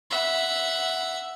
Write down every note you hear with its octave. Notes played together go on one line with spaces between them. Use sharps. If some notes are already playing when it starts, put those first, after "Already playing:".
E5 F#5